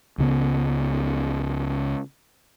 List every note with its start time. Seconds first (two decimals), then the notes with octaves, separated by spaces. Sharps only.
0.18 C#2 C#3 B3